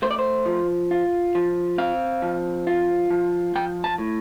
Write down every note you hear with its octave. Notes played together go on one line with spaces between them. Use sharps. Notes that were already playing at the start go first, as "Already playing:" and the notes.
A3 C5
D5
C5
F3
F4
F3
C4 F5
F3
F4
F3
F3 G5
A5
A2